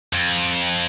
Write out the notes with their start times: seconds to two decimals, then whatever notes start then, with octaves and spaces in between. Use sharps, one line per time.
0.13 F2